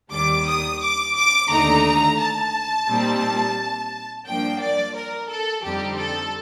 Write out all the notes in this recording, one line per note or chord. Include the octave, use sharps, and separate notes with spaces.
D#2 D#3 G3 D6
D#6
D6
D6
D#2 D3 A3 D#4 A#5
A5
A#2 G3 C4 D#4
G2 F3 A#3 D4 G5
D5
A#4
A4
F2 D3 G3 C4 D#4 G4
A4